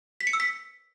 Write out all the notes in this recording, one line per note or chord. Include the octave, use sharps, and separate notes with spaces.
B6
C#7
E6
B6